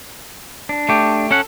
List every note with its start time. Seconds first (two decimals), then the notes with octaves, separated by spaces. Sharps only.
0.69 D4
0.89 A3 G4
1.31 C#4 A4 F#5